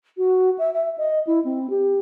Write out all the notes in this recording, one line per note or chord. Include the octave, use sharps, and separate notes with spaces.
F#4
E5
E5
D#5
E4
C4
G4